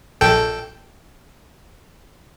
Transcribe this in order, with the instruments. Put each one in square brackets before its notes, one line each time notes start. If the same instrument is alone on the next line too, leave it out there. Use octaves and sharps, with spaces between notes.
[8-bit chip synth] A#1 A4 G5